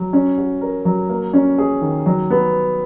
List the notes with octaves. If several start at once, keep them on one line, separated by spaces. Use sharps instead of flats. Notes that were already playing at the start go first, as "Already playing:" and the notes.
Already playing: F#3
C#4
F#4
A#4
F#3
A#3
C#4
G#4
D#3
F#3
B3